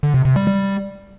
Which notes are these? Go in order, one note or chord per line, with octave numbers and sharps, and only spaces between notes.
D3
C3
C3
G3
G3